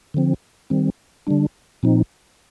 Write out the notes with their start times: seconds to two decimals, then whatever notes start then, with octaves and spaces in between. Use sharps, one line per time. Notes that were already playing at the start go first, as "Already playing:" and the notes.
0.14 D3 F3 C4
0.70 D#3 G3 C4
1.27 D3 G3 D4
1.83 A#2 F3 C4 D#4